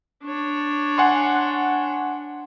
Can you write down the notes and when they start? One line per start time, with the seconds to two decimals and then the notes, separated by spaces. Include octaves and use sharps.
0.24 D4 C#5
0.98 F#5 G#5 C6